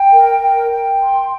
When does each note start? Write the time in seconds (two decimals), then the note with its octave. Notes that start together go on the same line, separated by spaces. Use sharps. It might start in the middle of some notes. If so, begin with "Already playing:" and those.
Already playing: G5
0.12 A#4
0.42 G5
0.72 G5
1.02 C6